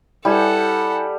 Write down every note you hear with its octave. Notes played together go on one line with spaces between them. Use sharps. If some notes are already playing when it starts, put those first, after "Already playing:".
G3 E4 A4 F#5 G#5